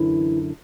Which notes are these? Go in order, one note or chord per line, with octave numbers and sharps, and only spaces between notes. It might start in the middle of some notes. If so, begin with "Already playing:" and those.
Already playing: F#2 D3 E3 E4